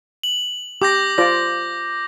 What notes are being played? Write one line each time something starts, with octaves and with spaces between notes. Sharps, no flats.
F#7
G4 D6 G6 A#6
F4 C5 D5 A#6